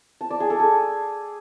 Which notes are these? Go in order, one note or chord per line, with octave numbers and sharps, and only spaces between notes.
A5
D5
G#4
A4
G#4